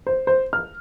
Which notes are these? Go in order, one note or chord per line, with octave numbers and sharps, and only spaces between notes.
C5
C5
F6